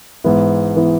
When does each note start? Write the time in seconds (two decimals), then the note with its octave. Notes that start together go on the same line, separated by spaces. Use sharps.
0.24 G#2 E3 B3 E4
0.76 E3 B3 E4